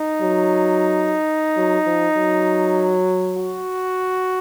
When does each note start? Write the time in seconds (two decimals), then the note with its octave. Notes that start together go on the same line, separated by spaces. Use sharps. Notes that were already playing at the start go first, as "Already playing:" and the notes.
Already playing: D#4
0.22 F#3
1.57 F#3
1.86 F3
2.17 F#3
3.37 F#4